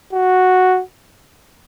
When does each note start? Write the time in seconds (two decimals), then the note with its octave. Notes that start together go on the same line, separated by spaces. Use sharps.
0.13 F#4